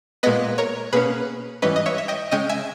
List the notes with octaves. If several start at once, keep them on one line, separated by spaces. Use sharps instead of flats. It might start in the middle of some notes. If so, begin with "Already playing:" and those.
A#2 G#3 B3 B4 D#5
A#4 C#5
B2 A#3 C#4 G#4 B4
G#2 E3 G3 C#4 B4 D#5
D#5
C#5 E5
E5
D#5 G5
C#3 G#3 C#4 D#5 G5
E5 G#5